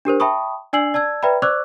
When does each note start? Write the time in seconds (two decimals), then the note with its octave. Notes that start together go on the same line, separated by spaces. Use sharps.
0.05 D4 G4 A#4 C5
0.20 E5 G5 A5 B5 C#6 D#6
0.73 D4 D5 G#5 E6 C7 F#7
0.94 D5 A5 E6 G#6
1.23 B4 D5 E5 G5 A#5 B5
1.42 C5 D5 C#6 D6 E6 F#6